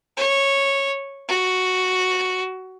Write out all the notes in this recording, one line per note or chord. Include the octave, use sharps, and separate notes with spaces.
C#5
F#4